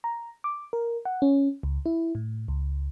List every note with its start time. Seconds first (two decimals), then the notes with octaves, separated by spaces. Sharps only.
0.04 A#5
0.44 D6
0.73 A#4
1.05 F#5
1.22 C#4
1.63 C#2
1.86 E4
2.15 A2
2.48 C#2